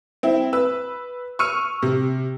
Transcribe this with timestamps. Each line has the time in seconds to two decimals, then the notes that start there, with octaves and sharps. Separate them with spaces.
0.23 C4 E4
0.53 B4 E6
1.39 C#6 E6 F6 C#7 D#7
1.82 C3